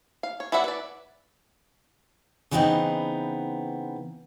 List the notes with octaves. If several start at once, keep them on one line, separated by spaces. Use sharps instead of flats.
F5
C#5
E4 F#4 D5 E5 F#5
B4 D5
C#3 E3 G3 B3 C4 D#4